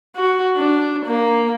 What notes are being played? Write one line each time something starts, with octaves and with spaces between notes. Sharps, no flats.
F#4
D4
A#3